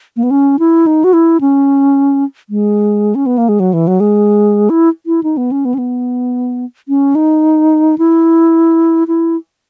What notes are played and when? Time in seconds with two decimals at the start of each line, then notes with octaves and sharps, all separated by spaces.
0.16 A#3
0.23 B3
0.31 C#4
0.59 E4
0.86 D#4
1.04 F#4
1.13 E4
1.41 C#4
2.50 G#3
3.15 C#4
3.26 B3
3.38 A#3
3.49 G#3
3.60 F#3
3.73 E3
3.87 F#3
4.00 G#3
4.70 E4
5.06 E4
5.23 D#4
5.37 B3
5.51 C#4
5.65 B3
5.74 C#4
5.78 B3
6.88 C#4
7.15 D#4
7.98 E4
9.08 E4